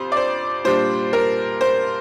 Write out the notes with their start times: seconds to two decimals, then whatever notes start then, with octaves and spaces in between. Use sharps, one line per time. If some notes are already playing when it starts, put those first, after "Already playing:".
Already playing: F2 C3 C5
0.12 D5
0.17 C5
0.64 A#2 G3 D4 C5
1.13 A#4
1.61 C5